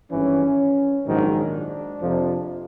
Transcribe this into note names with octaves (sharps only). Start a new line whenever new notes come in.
G#1 G2 E3 C#4
A#1 G#2 D#3 F#3 D4
F2 C3 F3